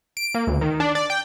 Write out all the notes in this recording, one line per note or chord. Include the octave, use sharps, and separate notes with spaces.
D7
A#3
D2
D#3
D4
D5
G5